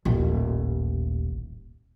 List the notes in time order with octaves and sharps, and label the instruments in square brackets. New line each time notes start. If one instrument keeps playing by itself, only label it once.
[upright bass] D#1 A1